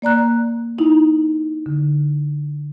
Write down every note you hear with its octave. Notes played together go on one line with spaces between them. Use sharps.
A#3 D5 A#5 F#6
D#4 E4
D3